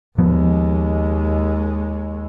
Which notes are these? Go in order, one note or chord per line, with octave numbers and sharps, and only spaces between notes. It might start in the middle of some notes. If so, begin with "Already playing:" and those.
D#2 F3 G#3 B3